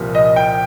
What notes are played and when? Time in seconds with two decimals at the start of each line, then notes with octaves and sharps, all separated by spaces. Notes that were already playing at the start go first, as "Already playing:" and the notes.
Already playing: C2 A#2 F3
0.15 D#5
0.36 G5